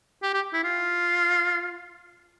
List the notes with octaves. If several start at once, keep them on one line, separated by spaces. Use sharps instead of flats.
G4
G4
E4
F4